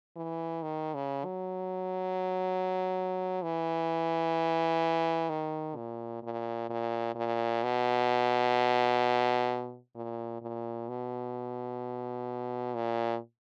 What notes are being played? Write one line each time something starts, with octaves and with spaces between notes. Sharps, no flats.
E3
D#3
C#3
F#3
E3
D#3
A#2
A#2
A#2
A#2
B2
A#2
A#2
B2
A#2